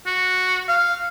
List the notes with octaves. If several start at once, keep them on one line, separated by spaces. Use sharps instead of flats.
F#4
F5